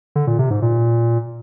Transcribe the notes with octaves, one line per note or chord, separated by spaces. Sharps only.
D3
A#2
C3
G#2
A#2